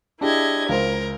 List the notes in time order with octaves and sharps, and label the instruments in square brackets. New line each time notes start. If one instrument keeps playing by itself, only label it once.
[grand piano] D4 G4 G#4 [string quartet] E4 D#5 G#6
[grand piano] C#2 C5 [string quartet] A#4